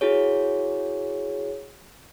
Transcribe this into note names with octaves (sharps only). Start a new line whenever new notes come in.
E4 F#4 G#4 C#5